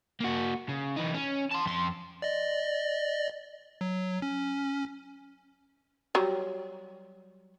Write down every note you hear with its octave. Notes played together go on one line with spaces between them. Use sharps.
A#3 F#4
C#3
E3 D#4
C#4
A5 C6
F2 C6
D5 D#5
F#3
C#4
F#3 G3